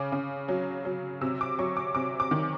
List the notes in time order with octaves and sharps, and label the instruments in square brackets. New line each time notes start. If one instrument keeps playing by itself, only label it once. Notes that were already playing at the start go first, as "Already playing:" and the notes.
Already playing: [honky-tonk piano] C#3 D6
C#3
F#3
F#3
C3 E6
D6
F#3 C#6
D6
C3 D6
D6
D#3